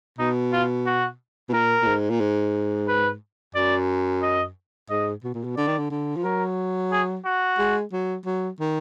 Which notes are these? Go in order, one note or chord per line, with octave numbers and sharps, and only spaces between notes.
B2 D#4
F4
F#4
B2
A#2 A#4
A#2
G#2
A#2
G#2
B4
F#2 D5
D#5
G#2 D#5
B2
A#2
B2
D3 D5
D#3
D3
D3
F3
F#3 A#4
G#4
F#4
G#3
F#3
F#3
D#3